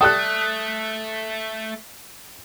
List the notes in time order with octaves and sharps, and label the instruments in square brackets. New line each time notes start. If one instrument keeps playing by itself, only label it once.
[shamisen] G3 A4 G5 [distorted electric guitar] A3 [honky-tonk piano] D#6 F#6